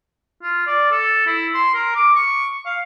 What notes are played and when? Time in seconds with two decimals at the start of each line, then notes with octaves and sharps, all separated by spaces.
0.42 F4
0.67 D5
0.92 A4
1.26 E4
1.54 C6
1.74 A#4
1.96 D6
2.16 C#6
2.66 F5